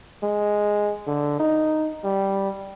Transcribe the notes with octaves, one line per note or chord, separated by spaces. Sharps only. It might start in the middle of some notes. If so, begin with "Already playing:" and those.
G#3
D3
D#4
G3